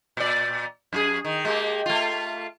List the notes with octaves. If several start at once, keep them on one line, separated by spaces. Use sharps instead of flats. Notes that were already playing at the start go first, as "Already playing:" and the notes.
A#2 D5
F#2 F4 G#4
D#3
G#3 A#3 G4
A3 F4